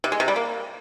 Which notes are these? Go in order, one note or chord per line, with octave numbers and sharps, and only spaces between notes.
C3
G#3
C3
G3
A#3